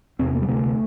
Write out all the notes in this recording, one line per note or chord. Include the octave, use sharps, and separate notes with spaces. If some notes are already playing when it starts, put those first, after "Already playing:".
E2 C3 C4
A#3
G3
D2 C3 A3